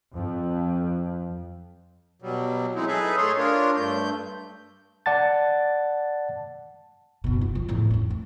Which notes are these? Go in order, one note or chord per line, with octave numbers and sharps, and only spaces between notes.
F2
B2 F#3 G3
E3 F#3 G#3 C4 D#4 E4
D#4 G#4 A4 B4 E5
A2 G#4 A4 C#5 C6
D4 F4 A#4 C#5
G2 A3 G6
D5 F#5 A5 A6
F#1 B2
F4
F3
E2 A2
F2 C#4
A3